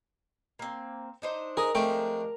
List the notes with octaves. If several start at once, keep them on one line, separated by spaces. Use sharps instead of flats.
A#3 C4
D4 D#4 C5
G#4 A#4 D#5
F3 G#3 A3 C4 D4 G5